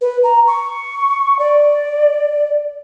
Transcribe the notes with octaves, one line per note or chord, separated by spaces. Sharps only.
B4
A#5
C#6
D5